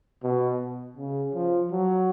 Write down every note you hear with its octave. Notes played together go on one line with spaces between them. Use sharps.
B2
C#3
F3
F#3